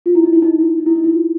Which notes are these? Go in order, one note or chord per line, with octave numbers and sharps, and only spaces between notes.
F4
E4
D#4
E4
D#4
E4
D#4
E4
D#4
E4
F4